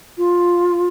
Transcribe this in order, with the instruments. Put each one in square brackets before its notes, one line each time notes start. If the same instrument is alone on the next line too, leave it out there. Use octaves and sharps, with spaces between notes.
[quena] F4